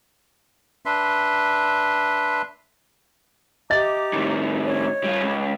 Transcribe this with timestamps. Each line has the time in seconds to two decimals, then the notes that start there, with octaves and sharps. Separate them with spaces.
0.86 D4 B4 E5 C6
3.70 G4 D#5 E5 A#5 D6 A6
4.13 A2 D#3
4.65 C#5
5.04 G3 F4
5.22 C#2